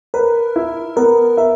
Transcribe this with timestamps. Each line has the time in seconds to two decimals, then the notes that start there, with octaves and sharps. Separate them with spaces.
0.14 A#4 B4
0.56 E4
0.96 B3 A#4
1.37 A#4 E5